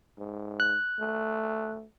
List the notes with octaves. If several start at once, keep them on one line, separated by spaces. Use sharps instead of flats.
G#2
F#6
A3